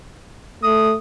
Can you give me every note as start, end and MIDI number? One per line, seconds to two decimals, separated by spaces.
0.63 0.95 57
0.63 0.94 87